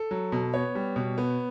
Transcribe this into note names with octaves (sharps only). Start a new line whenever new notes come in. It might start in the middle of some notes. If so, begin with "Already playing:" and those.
Already playing: A4
F#3
B2
B3 C#5
G3
B2
B3